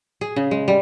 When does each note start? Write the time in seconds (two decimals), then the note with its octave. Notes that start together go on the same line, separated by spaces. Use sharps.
0.21 G#4
0.36 C#3
0.51 G#3
0.68 G3